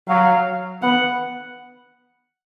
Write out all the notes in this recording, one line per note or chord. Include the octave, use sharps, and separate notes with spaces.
F#3 F5
B3 F#5